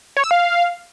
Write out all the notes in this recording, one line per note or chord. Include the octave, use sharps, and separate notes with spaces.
C#5
E6
F5